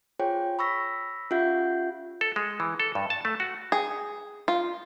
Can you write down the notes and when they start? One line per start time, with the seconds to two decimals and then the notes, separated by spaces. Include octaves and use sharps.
0.19 F4 G#4 C5 C#5 G5
0.59 B5 C#6 E6 A#6 B6
1.31 C#4 F4 G4 E5 F#5 G6
2.21 A4
2.36 G#3
2.60 E3
2.80 A4
2.95 G2
3.10 A5
3.25 A3
3.40 F#4
3.72 G#4
4.48 F4